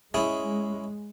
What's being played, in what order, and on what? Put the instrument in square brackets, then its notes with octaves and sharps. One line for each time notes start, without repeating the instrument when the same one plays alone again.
[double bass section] G#3 [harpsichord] C#4 E4 G#4